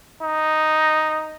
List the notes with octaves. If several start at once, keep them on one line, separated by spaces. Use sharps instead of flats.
D#4